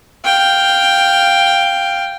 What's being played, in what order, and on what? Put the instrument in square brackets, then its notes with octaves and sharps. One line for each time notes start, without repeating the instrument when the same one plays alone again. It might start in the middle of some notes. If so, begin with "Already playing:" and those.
[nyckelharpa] F5 G5